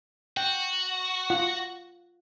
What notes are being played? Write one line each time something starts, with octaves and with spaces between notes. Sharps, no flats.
F#4 G5
F4 F#5